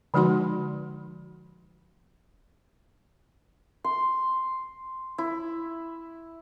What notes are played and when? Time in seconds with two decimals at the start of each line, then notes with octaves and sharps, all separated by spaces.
0.14 D3 F3 G#3 D#4 F#4 C6
3.84 C6
5.18 E4